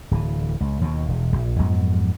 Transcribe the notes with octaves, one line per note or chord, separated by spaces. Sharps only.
D1 E3
C#2
D#2 B2
E1
A#1
F2 G#2 F#3 B3